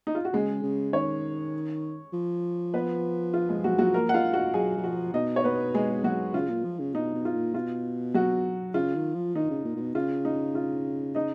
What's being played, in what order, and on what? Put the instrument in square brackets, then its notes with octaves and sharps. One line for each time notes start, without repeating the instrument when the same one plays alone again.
[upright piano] D#4
F4
F#4
[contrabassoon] C#3 [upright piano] G#3 G#4
[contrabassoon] C#3
[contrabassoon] D#3 [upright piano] C#4 C#5
[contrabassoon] F3
[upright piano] B3 B4
F4
G#3 G#4
F#3 F#4
F#3 F#4
A#3 A#4
F#5
F4 F5
F#4 F#5
[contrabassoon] F#3 [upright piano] G#4 G#5
[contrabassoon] F#3
[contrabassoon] F3 [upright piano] F#4 F#5
[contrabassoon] B2 [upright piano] D#4 D#5
[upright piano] C#5
B3 B4
G#3 G#4
F#3 F#4
[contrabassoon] C#3 [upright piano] F4
[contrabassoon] A#2
F3
C#3
[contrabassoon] B2 [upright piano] D#4
[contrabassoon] B2
[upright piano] F4
[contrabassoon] A#2
[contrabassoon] B2 [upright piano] F4
[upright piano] F#3 F#4
[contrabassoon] C#3 [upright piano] F4
[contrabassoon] D#3
F3
[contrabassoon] D#3 [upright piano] D#4
[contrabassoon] C#3
A#2
A#2
B2
[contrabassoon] C#3 [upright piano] F4
[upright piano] D#4
F4
D#4 D#5